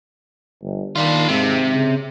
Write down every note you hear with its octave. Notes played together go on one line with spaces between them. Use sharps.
G1
D#3 D4 F4
G#2 C3
C#3